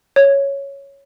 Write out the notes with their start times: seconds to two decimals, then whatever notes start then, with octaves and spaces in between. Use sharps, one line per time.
0.16 C#5